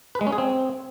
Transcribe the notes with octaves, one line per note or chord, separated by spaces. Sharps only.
B4
G#3
C#4
G#4
C4